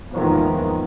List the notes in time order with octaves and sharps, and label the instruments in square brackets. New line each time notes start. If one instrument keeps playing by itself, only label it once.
[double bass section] E2 G#2 D#3 F3 A#3 B3